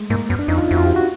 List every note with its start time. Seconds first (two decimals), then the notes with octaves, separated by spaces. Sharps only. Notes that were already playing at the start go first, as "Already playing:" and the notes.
Already playing: G#3 A3
0.10 G#2 A#3
0.29 F#2 B3
0.39 D4
0.48 F2 D#4
0.58 F4
0.68 F2 E4 F#4
0.77 F4
0.87 G4
0.96 F#4